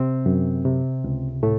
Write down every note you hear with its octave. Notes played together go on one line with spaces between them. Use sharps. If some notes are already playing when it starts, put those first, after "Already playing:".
Already playing: C3 C4
F#2
C3
C#2
A2 A3